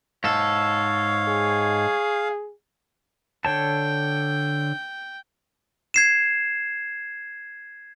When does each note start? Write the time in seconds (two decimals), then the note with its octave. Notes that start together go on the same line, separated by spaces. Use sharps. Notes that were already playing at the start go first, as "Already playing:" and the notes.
0.24 G#2 A4 C#5 F5
1.28 G#4
3.45 D3 C#5 G5 A5
5.94 G#6 C7 E7